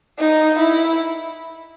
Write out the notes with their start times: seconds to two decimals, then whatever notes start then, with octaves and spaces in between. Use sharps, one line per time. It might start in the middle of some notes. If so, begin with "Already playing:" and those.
0.19 D#4
0.59 E4